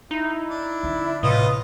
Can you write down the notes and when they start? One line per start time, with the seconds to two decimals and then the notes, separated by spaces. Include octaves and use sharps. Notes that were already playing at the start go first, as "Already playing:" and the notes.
0.11 D#4 E4
0.48 D4
0.83 D3 C#4
1.23 A1 A2 C3 F4 B4 D#5 D#6